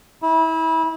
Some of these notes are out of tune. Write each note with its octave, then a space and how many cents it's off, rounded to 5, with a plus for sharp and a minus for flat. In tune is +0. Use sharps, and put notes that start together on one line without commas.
E4 -30